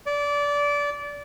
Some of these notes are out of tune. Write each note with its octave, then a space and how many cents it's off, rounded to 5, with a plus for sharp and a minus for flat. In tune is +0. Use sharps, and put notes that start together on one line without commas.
D5 -20